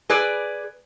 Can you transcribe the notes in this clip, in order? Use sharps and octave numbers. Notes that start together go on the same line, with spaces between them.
G#4 B4 D5